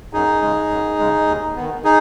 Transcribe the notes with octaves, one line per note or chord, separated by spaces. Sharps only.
F#2 D#4 G#4
C#3 G#3
F#2
C#3 G#3
D#2
D#3 B3
D#4 G#4